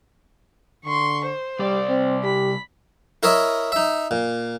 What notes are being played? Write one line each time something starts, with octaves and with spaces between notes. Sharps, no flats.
D3 C6 C#6
C5
C2 G3 D5
C4
G4 B5
E4 A#4 C#5 D#5 E5
D#4 E5
A#2